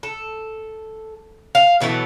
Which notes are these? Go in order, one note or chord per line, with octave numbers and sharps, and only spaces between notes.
A4
F5
B2 E3 F#3 A3